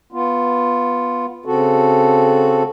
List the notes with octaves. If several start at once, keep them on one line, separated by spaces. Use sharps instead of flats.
B3 F4
C#3 C4 F#4 A4